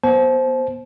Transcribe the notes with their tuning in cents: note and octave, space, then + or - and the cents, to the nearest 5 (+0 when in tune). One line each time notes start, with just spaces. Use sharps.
B3 -20 C5 +0 A5 -35